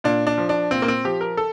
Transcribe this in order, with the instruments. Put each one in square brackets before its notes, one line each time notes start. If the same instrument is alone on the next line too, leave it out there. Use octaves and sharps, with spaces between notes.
[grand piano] A#2 D4
D4
F3
D4
A#2 C4
A#3
C4
F3 G4
A#4
A4